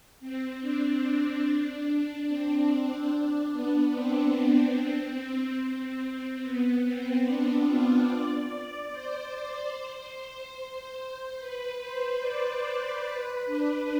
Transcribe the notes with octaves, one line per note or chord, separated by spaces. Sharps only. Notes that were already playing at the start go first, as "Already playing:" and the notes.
C4
D4
C4
C4
D4
B3
C4
C4
C4
B3
C4
D4
F4
D5
C5
B4
C5
D5
C5
B4
D4